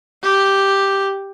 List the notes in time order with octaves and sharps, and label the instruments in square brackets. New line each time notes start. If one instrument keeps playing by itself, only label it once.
[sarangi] G4